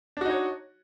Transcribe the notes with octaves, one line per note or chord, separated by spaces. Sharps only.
D4 D#4 F#4 C#5